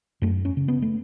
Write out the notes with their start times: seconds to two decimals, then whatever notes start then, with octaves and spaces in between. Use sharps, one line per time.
0.22 F#2 A3
0.45 C#4
0.57 C#3
0.68 B3
0.82 A3